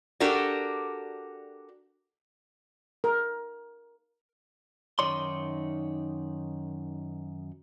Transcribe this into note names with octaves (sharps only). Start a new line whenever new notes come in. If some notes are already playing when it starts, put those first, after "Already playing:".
D4 F#4 G4 A4 A#4 D5
A#4
F#2 D#3 D#4 C#5 D5 C6